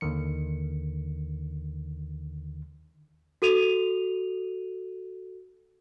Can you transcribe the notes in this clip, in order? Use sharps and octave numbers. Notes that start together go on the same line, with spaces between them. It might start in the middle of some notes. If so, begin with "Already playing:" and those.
D#2 D3 D#3 C#7
F#4 A4 D#7 F7